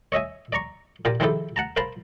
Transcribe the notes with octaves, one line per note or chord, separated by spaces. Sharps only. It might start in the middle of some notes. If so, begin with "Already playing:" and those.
C#5 D#5 E5 G#5
D5 A#5 C#6
A#2 F4 G4 A#4
D#3 F3 G#3 E4 G4 A4
F#5 A5 A#5
A#4 C5 F5 A5 B5 C6